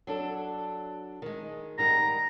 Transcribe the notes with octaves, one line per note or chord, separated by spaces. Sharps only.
F#3 D4 A4
D#3 G#3
G#2 D#3 G3 A#5